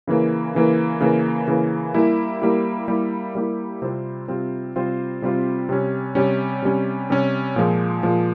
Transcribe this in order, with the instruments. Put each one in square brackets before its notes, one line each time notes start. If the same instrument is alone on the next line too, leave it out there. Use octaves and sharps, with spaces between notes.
[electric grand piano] C#3 E3 A#3
C#3 E3 A#3
C#3 E3 A#3
C#3 E3 A#3
G3 A#3 E4 G4
G3 A#3 E4 G4
G3 A#3 E4 G4
G3 A#3 E4 G4
C3 G3 C4 F4 C5
C3 G3 C4 F4 C5
C3 G3 C4 F4 C5
C3 G3 C4 F4 C5
C3 G3 C#4
C3 G3 C#4
C3 G3 C#4
C3 G3 C#4
A#2 F3 G#3
A#2 F3 G#3